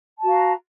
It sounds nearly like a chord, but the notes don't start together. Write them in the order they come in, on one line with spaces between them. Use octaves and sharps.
A5 F#4 F5 A#5